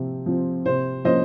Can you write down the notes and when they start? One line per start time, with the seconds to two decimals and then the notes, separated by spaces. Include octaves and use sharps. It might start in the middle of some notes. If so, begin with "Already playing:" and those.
Already playing: C3 F3 C4
0.26 F3 C4
0.65 C3 C5
1.05 F3 A#3 C#4 C5 D#5